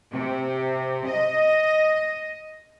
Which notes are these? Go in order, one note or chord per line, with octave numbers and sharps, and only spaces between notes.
C3
D#5